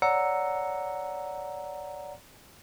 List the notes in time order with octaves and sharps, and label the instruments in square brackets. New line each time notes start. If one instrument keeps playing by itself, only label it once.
[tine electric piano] C#5 D5 F#5 A#5 E6 C#7